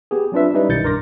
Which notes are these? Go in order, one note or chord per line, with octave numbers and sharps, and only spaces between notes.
B3 G4 G#4
F#3 C4 D4 F4 B4 E5
G3 C#4 D#4 E4 B4 D#5
B1 D#3 G4 G6 A6 C#7
G2 A#4 C6 D6 A#6